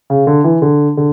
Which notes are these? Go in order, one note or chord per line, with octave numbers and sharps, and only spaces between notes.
C#3
D3
E3
D3
D3